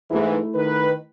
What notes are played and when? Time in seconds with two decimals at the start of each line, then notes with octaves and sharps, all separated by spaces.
0.10 G#2 E3 A3 E4
0.55 D#3 B4